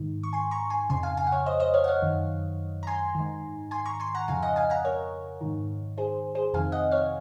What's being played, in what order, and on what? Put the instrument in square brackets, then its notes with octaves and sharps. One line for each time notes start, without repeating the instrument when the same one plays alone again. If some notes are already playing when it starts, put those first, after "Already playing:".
Already playing: [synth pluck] G#2 D#3
C#6
G#5 C6
A#5 C#6
G#5 C6
F2 C#3 G#5 C6
F5 G#5
F5 G#5
F#5
C#5 F5
C5 D#5
C5 D#5
C#5 F5
F#5
C#5 F5
F#2 D#3
A#5
G#5 C6
G#2 D#3
G#5 C6
A#5 C#6
G#5 C6
F#5 A#5
F2 C#3 F5 G#5
D#5 F#5
F5 G#5
F#5 A#5
A#4 C#5
G#2 D#3
G#4 C5
G#4 C5
F2 C3 D#3 F5 G#5
D#5 F#5
C#5 F5